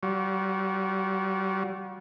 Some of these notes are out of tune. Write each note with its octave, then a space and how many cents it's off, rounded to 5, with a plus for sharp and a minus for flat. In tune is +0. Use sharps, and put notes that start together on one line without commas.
G3 -35 F#4 -30